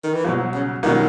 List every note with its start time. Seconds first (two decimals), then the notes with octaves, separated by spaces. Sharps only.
0.04 D#3
0.14 E3
0.25 C2 B2 F3 F#3
0.54 C#3
0.83 C2 B2 D#3 F#3